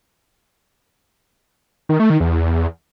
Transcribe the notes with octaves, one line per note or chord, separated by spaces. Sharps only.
D#3
A3
D#3
E2